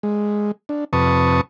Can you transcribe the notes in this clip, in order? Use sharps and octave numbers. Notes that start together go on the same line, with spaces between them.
G#3
D4
F2 C3 B4 A5 C#6 D#6